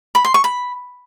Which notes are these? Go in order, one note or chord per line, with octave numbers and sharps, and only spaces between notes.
B5
C6
C#6
B5